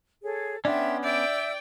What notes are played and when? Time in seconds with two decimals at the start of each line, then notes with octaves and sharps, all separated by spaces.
0.24 G#4 A4 C#5
0.65 B3 C#4 D4 E5 G5 C6
1.03 D5 E5 G5 E6 G6